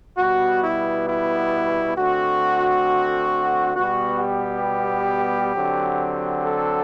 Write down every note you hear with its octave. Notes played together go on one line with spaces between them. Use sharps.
B2 G3 B3 F#4
E4
E4
D3 A3 C4 F#4
B2 G3 B3 F#4
G4
D3 F#3 C4
A4